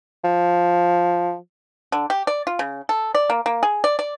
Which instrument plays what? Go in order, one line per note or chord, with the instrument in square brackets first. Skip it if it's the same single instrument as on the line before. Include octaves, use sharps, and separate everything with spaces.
[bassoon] F3
[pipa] D3
G4
D5
F4
C#3
A4
D5
A#3
A#3
G#4
D5
D5